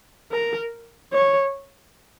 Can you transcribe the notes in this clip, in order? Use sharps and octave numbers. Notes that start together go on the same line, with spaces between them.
A#4
C#5